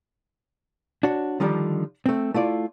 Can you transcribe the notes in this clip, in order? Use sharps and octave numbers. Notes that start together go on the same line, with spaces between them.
D4 F#4 C#5
D3 D#3 F3 G3 D4
A3 C4
A3 E4 F4 D5